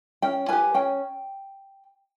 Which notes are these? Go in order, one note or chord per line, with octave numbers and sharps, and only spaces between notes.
C#4 G5
G4 B4 G#5
C#4 G5